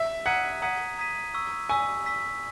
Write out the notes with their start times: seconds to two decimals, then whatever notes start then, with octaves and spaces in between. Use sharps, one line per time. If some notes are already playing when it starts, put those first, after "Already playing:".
Already playing: E5
0.26 F#5 A#5 D#6 G#6 B6 D#7
0.62 F#5 A#5 D#6 G#6 B6 D#7
0.98 A#5 D#6 G#6 B6 D#7
1.34 C#6 E6 B6
1.69 G#5 C#6 E6 B6
2.06 C#6 E6 B6